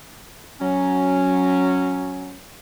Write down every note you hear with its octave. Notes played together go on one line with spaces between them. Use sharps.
F#3 C#4